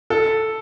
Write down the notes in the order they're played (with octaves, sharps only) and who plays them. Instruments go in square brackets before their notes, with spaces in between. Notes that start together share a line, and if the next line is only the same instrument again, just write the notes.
[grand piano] A4